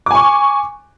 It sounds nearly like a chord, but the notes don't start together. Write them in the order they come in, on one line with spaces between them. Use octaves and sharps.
D6 G#5 C#6